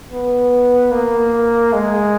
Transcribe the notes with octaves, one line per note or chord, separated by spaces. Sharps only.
B3
A#3
G#3